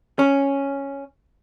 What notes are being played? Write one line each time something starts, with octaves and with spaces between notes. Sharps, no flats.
C#4